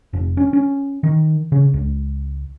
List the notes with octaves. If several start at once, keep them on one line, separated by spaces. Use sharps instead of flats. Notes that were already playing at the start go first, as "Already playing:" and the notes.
F1
C#4
C#4
D#3
C#3
C#2